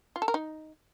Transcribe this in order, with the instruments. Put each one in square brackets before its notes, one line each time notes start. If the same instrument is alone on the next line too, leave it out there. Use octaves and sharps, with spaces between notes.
[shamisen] F4
A4
A#4
D#4